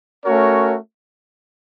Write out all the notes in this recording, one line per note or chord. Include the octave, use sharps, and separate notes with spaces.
A3 C#4 F#4 A#4 C#5